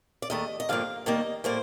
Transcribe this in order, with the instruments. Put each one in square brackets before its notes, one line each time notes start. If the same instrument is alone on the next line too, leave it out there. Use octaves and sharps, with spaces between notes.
[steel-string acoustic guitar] D5
D#2 D#3 A3 D#5
D#5
G2 D3 F3 A#3 F5
D#2 D#3 G3 A#3 D#5
A2 G3 A#3 C5